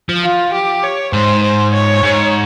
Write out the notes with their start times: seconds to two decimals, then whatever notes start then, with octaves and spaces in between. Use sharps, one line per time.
0.09 F3
0.24 F4
0.54 G4
0.83 C#5
1.13 G#2 C5
1.43 C5
1.73 C#5
2.03 G#2